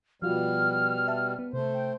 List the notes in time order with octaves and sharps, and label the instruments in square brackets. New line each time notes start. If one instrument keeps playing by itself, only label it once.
[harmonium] B2 G3 [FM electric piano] F3 F4 F#4 [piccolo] F6
[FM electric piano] E5 A5
B3
[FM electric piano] C3 [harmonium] A3 C5
[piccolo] G5